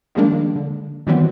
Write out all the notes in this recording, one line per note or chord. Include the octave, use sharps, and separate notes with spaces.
D#3 F3 G3 G#3 A#3 D4
D3
D#3 E3 F#3 G3 B3 C4